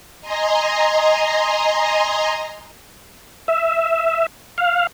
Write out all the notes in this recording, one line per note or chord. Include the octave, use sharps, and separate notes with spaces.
D#5 G#5 A#5 C6
E5
F5